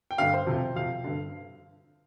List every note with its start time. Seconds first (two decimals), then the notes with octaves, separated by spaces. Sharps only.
0.11 G5
0.18 G2 D3 F5
0.34 C5
0.47 F2 C3
0.76 F2 C3 F5
1.04 G2 D3